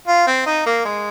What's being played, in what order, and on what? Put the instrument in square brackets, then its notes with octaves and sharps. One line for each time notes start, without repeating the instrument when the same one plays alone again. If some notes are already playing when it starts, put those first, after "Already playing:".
[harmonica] F4
C4
D#4
A#3
G#3